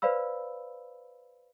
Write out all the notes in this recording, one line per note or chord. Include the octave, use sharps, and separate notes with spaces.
B4 C5 D5 F5 B5 E6